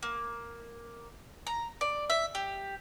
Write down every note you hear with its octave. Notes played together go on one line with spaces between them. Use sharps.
A#3
A#5
D5
E5
G4